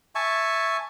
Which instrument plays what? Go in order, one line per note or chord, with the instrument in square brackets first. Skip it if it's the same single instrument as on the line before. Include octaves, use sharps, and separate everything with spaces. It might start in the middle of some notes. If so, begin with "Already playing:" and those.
[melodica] E5 G#5 A5 C#6